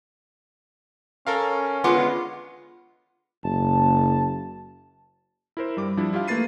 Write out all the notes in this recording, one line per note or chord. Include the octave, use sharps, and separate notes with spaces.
C#4 A4 A#4 F5
D3 G#3 B3 F4 C6 D6
F#1 A5
E4 A#4 C5
G2 G3 D6
F3 G3 D4 E4
E4 F4 G4 F5
A3 A#3 B4 A6 C7 D#7